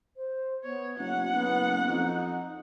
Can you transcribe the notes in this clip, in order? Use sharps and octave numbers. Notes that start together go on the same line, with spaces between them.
C5
B3 C#5
F#1 F#4 F#5
F#1 B3
F2 D#4